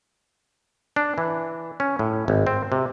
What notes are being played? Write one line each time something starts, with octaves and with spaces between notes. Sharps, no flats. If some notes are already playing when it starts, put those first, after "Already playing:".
D4
E3
C#4
A2
G#1
C4
C3